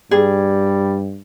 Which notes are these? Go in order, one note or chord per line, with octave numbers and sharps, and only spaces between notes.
G2 G3 G#4